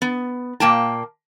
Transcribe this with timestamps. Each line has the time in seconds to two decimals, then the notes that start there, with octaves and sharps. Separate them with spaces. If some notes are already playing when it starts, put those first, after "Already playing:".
0.02 B3
0.60 A#2 A#3 G5 A5